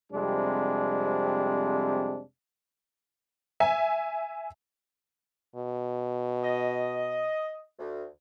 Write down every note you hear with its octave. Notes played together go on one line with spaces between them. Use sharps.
F2 C3 G3 G#3 C4 D4
E5 G#5
B2
D#5
D2